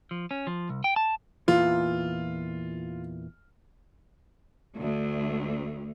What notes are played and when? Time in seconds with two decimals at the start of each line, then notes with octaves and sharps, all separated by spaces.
0.11 F3
0.31 C#4
0.47 F3
0.69 C2
0.84 G5
0.96 A5
1.48 E2 A#2 E3 F4
4.76 D2